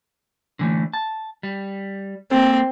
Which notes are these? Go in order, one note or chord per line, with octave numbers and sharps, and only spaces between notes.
D3 E3 A3
A5
G3
A#3 C4 A4